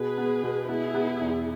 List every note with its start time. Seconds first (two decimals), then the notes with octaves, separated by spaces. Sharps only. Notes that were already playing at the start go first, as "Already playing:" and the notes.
Already playing: B2 G#4 B4
0.18 B3
0.43 B2
0.69 B3 E4 G#4
0.95 B3
1.21 E2